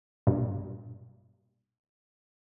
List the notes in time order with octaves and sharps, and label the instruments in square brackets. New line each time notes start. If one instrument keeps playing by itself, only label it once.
[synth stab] B1 G2 A#2